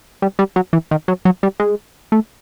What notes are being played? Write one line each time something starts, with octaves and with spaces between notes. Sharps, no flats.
G3
G3
F#3
E3
D#3
F#3
F#3
G3
G#3
A3